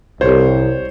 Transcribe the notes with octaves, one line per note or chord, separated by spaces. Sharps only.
C2 C5 C#5